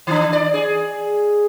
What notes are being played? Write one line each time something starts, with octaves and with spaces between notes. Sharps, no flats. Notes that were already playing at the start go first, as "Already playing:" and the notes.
D#3 D4
D5
G#4